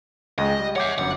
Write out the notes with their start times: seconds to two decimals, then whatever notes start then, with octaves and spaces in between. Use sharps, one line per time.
0.38 C#2 G#3 D#5 G5
0.59 G3
0.76 C#5 E5 F#5 D6 G6
0.98 G1 F#2 F#5